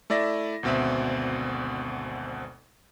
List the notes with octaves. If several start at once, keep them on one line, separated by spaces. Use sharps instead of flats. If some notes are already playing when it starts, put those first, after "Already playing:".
A3 E4 D5 E5 A#6
G#1 D2 B2 C4 E5